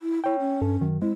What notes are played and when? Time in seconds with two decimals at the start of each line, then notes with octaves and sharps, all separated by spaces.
0.01 E4
0.24 E4 C#5 G5
0.39 C#4
0.62 G2 A4
0.81 F#2 D#3 F#3
1.02 G#3 C4 E4